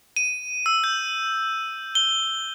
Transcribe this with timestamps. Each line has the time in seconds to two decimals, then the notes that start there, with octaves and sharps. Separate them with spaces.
0.17 D#7
0.66 E6
0.84 G6
1.95 G7